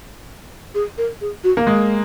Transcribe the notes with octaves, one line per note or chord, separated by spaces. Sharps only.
G#4
A#4
G#4
F#4
A#3
G#3